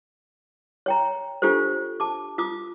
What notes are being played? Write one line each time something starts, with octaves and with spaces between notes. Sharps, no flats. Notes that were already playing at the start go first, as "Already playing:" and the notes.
C#5 G5 A#5
D4 F4 G4 A4 C5
A5 D6
F4 D6 D#6